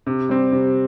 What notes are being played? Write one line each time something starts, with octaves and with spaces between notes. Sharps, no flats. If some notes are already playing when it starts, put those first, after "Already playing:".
C3
G3 C4
C3